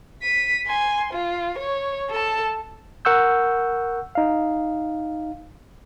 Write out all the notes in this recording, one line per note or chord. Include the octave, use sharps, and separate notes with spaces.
B6 D#7
G#5 C6
F4
C#5
A4 A5
A#4 F#5 C#6 E6 G6
D#4 F5